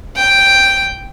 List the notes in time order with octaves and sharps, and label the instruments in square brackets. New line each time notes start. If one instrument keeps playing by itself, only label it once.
[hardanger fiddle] G5